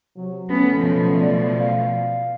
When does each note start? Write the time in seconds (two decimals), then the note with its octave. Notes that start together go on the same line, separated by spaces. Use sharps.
0.17 C3 F#3
0.50 C#3 F#3 A3 B3 C#4
0.79 B2 F3
1.20 D5
1.60 F5